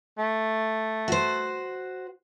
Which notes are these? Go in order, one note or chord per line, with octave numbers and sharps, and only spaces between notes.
A3
F#4 C5